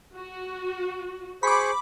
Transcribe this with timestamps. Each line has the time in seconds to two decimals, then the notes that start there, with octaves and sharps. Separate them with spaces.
0.15 F#4
1.43 G#4 C5 B5 C#6 D6